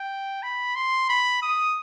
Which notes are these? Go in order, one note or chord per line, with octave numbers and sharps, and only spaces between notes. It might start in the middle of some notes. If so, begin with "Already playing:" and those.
Already playing: G5
B5
C6
B5
D#6